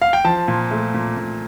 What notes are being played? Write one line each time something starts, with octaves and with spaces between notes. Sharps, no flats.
F5
G5
F3 A5
A#2
A3
A#2
A#2